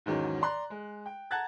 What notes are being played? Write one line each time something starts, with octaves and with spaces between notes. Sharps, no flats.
E2 G#2 D#3 F#3 C#4
D5 A#5 C6 F#6
G#3
G5
F#5 A5 A#5 F#6 G#6 A6